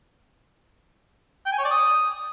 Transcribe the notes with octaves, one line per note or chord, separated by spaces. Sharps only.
G5
G#5
C#5
D5
D#6